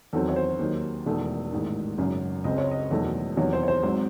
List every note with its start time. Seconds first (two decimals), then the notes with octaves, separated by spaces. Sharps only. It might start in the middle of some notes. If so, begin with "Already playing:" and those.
0.13 E2 D#3 F#3 C4 A4
0.29 C#5
0.36 C5
0.59 D#2 D#3 F#3
1.06 E1 E2 D#3 A3
1.52 A1 G#2 D#3
1.98 G#1 F#2 C#3
2.44 C#2 C#3 G#3 C4 D#5
2.58 C#5
2.71 D#5
2.91 E1 E2 D#3 F#3 A3
3.36 E2 C3 D#3 F#3 C#5
3.53 C5
3.63 C#5
3.68 C5
3.83 G#1 G#2 F#3 C4